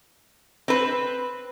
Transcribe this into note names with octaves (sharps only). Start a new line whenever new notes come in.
C4 B4